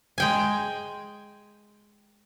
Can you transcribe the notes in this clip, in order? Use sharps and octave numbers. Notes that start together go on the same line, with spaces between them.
G#3 G5 G#5